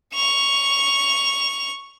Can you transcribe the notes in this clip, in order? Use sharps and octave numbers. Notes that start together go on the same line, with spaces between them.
C#6 F7